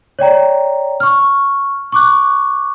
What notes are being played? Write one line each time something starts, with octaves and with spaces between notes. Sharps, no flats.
C#5 D5 G5 A#5
C#6 F6
C#6 D6 F#6